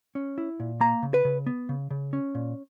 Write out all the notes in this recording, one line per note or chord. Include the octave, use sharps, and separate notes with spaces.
C#4
E4
A#2
A#3 A#5
C#3
B4
C#3
B3
C#3
C#3
C#4
A#2